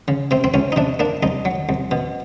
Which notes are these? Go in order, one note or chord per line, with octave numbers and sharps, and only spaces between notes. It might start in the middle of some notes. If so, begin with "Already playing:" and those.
C#3
C3 C4
C4
C#2 C#4
D#4
C3 D4
A#3 D4
C2 D#4
F#3
C2
B2